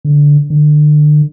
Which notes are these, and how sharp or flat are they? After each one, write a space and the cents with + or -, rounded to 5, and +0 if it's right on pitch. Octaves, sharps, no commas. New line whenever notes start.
D3 -10
D3 +30